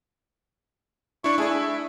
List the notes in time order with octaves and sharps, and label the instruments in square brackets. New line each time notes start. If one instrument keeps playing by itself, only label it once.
[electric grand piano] D4 E4 [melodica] C#6
[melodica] A3 G#4 [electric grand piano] D4 E4
[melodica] E5